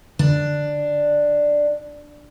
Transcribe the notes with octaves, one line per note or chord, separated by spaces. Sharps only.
D3 D4